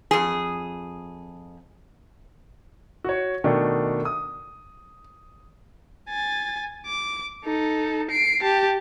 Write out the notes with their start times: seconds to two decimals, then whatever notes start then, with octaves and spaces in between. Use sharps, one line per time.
0.11 F2 G#4
3.04 F#4 C#5
3.44 B2 D#3 A3 D4
4.05 D#6
6.09 G#5 A6
6.86 D6
7.45 D#4 A4
8.11 C7 D7
8.43 G4 A5